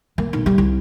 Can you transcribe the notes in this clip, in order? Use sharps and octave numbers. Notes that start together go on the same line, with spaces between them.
A#3
B1
G3
C2